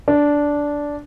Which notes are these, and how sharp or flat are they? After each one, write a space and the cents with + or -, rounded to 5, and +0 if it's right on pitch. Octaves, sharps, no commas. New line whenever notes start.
D4 -10